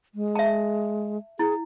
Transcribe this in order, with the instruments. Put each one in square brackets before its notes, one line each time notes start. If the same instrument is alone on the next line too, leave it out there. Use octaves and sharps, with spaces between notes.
[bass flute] G#3
[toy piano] E5 A5
[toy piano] E4 [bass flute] G#4